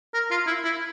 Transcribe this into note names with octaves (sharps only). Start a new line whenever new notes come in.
A#4
F4
E4
E4